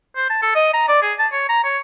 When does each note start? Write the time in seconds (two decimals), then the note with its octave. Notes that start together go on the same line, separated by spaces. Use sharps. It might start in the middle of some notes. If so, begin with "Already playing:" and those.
0.16 C5
0.30 A5
0.42 A4
0.56 D#5
0.74 A#5
0.88 D5
1.03 G#4
1.19 A5
1.32 C#5
1.49 A#5
1.64 C#5